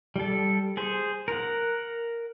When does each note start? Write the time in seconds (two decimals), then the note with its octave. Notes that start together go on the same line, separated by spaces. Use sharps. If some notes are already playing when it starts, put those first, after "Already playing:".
0.16 G3 A4
0.77 G#4 C5
1.28 A#4 F#5